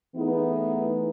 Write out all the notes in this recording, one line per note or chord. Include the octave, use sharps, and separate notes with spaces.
E3 A3 B3 D#4 E4 G#4